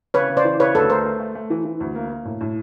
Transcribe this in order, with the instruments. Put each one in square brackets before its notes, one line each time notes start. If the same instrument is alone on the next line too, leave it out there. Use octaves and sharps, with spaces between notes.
[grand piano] C#3 [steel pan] B4 C#5
[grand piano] C#3
[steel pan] C5 D5
[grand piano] E3
[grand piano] C#3 [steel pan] B4 C#5
[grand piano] D2 [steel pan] A4 B4
[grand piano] A3 [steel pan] A#4 C5
[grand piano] A3
A3
A3
E3
E3
D2
A#3
A#3
A2
A2